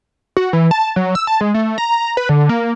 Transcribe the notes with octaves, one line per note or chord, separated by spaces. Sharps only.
F#4
E3
A5
F#3
E6
A5
G#3
A3
A#5
B4
D3
A#3